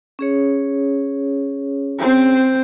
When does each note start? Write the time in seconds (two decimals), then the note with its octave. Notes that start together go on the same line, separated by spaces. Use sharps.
0.19 C#4 G#4 C#5
1.99 C4 C5